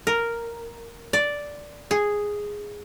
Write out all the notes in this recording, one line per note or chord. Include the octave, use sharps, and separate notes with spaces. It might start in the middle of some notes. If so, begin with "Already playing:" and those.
A#4
D5
G#4